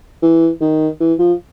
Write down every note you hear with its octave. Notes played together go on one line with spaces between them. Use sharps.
E3
D#3
E3
F3